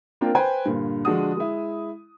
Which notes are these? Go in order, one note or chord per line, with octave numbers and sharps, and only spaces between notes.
A#3 C4 D4 F4 A#4 G5
B4 C5 G5 G#5
G2 A#2 D3
D3 F3 G#3 D4 F#4 D#6
G#3 E4